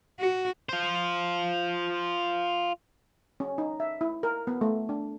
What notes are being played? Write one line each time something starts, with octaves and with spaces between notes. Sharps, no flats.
F#4
F4 C5
C#4
D#4
E5
E4
A#4
B3
A3
D4